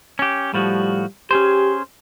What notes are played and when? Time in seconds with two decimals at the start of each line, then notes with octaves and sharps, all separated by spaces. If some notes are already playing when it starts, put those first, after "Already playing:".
0.19 C#4 G4
0.54 A2 F3 G3 F#4
1.31 C#4 G4 G#4 C5